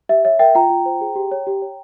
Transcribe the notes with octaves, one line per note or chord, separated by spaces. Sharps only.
G4 E5
C#5 E5
A#4 E5 G5
F4 G5 A#5
F4
C5
G#4
G4
C#5
G4
C#5